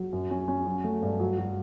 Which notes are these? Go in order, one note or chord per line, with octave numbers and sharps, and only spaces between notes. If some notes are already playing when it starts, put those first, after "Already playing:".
Already playing: F#3
F#2
C#4
C#4
F#3
A3
G2
F#3
F#3